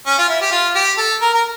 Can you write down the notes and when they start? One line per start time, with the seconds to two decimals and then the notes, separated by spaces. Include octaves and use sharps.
0.06 C#4
0.18 F4
0.29 E4
0.42 G4
0.51 F4
0.75 G4
0.97 A4
1.21 A#4
1.34 A#4